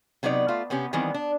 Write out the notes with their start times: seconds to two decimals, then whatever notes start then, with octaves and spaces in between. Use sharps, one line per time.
0.23 C3 F#3 B3 D#4 D5
0.48 A3 F4
0.70 C3 B3 C#4 G4
0.93 D#3 E3 G3 B3 C4
1.14 D4